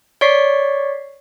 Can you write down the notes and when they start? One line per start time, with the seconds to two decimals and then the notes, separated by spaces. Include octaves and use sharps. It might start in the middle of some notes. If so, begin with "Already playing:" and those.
0.21 C#5 D5 C#6 B6 C7